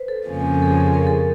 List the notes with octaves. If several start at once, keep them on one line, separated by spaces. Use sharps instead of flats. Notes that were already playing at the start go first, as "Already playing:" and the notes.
Already playing: B4 C5
A4
F2 C#3 F3 A#3 C#4
A4
G#4
A4
A#4
A4